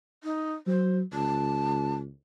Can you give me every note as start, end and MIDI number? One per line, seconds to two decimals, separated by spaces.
0.24 0.54 63
0.67 1.02 54
0.67 0.97 72
1.13 2.13 37
1.13 1.95 81